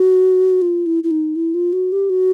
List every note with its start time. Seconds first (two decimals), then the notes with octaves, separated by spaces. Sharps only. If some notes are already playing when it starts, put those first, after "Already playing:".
Already playing: F#4
0.62 F4
0.86 E4
1.04 E4
1.11 D#4
1.36 E4
1.54 F4
1.73 F#4
1.92 G4
2.10 F#4